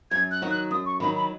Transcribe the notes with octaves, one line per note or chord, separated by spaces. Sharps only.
F#2 G#6
F#6
D#3 F#3 D#4 F#4
F#6
F#2 D#6
C#6
D#3 F#3 D#4 F#4 B5
B5